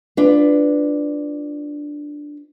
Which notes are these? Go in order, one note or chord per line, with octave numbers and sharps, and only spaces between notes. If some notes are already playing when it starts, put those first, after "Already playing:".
D4 F4 B4